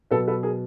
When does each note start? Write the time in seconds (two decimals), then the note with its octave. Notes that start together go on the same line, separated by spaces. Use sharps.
0.11 B2 F#3 B3 A4 B4
0.27 A4 B4
0.43 G#4 A#4